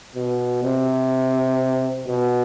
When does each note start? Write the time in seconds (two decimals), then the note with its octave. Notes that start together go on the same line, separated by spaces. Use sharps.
0.16 B2
0.64 C3
2.08 B2